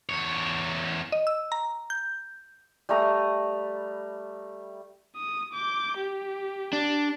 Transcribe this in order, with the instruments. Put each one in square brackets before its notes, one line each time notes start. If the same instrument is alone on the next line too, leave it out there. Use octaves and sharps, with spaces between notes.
[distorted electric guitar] E2 C#5
[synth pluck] D#5
E6
A#5
G6
[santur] G3 A3 A#5 D#6
[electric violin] D#6
D6 G6
G4
[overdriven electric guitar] D4